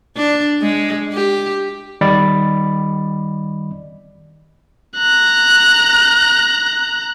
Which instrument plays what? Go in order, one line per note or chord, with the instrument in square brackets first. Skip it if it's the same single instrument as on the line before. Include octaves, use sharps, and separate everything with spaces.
[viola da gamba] D4
G#3
G4
[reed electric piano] D#3 G3 D5 D#5 B5 A6
[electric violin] A#5 F#6